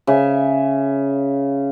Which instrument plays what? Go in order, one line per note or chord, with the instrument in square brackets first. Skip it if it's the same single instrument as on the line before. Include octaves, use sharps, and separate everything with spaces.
[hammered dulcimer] C#3 E5